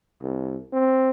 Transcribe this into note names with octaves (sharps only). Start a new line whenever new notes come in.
C2
C4